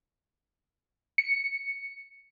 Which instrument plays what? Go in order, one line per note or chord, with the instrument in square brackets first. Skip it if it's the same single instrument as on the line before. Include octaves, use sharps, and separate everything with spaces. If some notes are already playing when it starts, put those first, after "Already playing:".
[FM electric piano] C#7